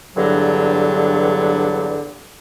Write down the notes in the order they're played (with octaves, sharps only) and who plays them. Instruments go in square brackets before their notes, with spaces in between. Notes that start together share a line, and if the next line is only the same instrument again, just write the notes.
[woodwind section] E2 G2 D3 F#3